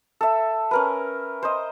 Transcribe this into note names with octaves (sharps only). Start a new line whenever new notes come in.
A4 E5
C#4 A#4 B4
C5 D#5